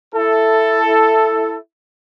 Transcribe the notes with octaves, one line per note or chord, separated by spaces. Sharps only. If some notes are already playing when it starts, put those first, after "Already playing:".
E4 A4